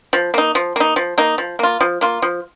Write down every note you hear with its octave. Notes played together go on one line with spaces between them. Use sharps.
F3
A#3 D#4
F3
A#3 D#4
F3
A#3 D#4
F3
A#3 F4
F3
A#3 F4
F3